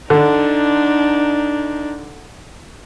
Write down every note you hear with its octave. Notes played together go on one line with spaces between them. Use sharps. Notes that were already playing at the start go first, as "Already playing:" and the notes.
D3 D4 D#4